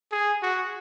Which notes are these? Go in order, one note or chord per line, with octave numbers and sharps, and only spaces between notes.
G#4
F#4